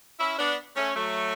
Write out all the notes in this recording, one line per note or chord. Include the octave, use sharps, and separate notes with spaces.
C#4 E4
B3 D4
A3 C#4
F#3 A3